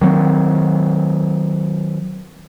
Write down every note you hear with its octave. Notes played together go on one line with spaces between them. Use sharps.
D#3 F#3 A#3 C4